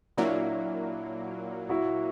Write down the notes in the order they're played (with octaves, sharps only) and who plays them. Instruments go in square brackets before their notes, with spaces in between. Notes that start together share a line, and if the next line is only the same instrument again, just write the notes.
[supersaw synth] A#2 F#3 A#3 [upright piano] D4 E4
[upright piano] E4 F#4